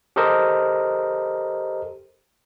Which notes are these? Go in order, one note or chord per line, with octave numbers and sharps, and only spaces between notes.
G4 A4 A#4 C5 D#5